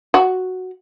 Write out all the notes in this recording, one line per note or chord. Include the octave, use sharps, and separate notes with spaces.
F#4